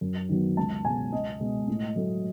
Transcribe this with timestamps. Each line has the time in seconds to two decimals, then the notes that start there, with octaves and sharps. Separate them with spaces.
0.01 F#2
0.29 D#3 F#3 B3
0.57 C#2 A5
0.85 B2 G#3 G#5
1.12 C#2 D#5
1.40 B2 G#3
1.68 A2
1.96 F#3 A3